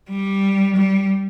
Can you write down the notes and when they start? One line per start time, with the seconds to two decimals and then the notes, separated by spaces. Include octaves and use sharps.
0.11 G3
0.76 G3